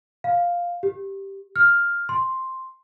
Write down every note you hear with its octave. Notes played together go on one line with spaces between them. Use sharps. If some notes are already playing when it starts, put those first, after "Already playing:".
F5
G4
F6
C6